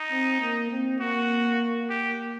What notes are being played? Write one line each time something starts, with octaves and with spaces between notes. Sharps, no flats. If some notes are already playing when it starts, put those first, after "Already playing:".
Already playing: D#4
C4
A#3
C4
A#3 F#4
G4